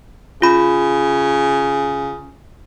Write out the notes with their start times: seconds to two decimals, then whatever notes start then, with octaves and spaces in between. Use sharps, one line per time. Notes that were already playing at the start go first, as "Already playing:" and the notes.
0.42 C#3 F4 B5